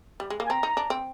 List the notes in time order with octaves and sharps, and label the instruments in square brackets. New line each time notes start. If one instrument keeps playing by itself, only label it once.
[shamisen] G3
G#3
A#3
[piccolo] G#5
[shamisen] C4 [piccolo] A#5
[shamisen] D#4
D4
C4